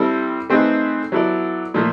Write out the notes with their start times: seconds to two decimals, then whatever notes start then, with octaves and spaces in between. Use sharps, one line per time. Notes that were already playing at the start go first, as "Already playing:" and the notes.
Already playing: G3 C4 E4 A4
0.50 A3 C4 D#4 G#4 B4
1.12 F#3 B3 E4 A4 D5
1.74 A#2 F3 A3